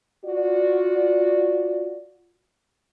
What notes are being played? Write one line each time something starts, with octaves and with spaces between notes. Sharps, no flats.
F4 F#4 D5